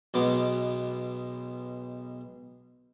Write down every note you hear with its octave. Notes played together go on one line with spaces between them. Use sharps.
B1 B2 G#3 B3 D6